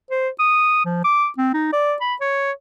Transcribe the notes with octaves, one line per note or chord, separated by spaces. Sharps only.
C5
D#6
F3
D6
C4
D#4
D5
B5
C#5